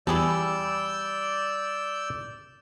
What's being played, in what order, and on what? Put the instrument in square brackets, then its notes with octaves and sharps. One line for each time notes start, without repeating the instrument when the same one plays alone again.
[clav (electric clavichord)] E2 [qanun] G3 [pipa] E4 G#4 A4 [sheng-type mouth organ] D5 E6 G6